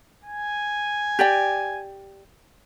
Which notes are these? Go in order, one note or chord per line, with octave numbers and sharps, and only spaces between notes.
G#5
G4 D5 G5